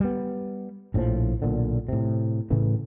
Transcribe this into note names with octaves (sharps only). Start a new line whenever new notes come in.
G3 B3
A#1 A2 D3 F3
B1 A#2 D3
A2 C3
A2 C#3 E3 A3